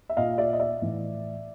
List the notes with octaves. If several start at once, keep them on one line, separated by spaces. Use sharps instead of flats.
E5
A#2 D#5 F5
D5 E5
D#5
D5 E5
A2 E3